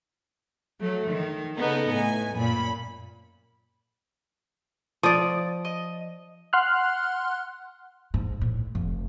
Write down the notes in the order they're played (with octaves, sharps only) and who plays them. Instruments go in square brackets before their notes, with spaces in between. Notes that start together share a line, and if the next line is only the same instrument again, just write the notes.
[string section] F#3 A3
D#3
C#3 B3 D#4 A4
A2 G#5
F#2 A#2 B5
[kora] F3 D5 [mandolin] D#6
[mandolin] D#5
[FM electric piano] F#5 C6 F6 F#6
[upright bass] G#2
A2
F1